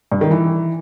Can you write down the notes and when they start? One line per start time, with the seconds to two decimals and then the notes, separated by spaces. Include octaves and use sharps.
0.12 G2
0.21 D#3
0.31 E3